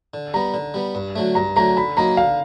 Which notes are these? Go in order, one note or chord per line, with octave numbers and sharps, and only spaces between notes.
D3
G3 B3 A#5
D3
G3 B3
G2
D3 F#3 A3
G2 A#5
D3 F#3 A3 A#5
D3 B5
F#3 A#3 D#4 A#5
D3 F5